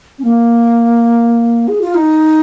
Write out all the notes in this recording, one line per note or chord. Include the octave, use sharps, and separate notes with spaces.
C#4
A#3
G#4
F4
D#4